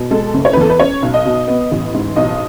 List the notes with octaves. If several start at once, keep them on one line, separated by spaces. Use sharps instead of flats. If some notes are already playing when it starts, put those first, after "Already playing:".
Already playing: B2
G#3 A4
F#1
C#5
B4
E2 A4
B4
C#4 C#5
B1
D#5
B2
B3
A1
G#2
B1 D#5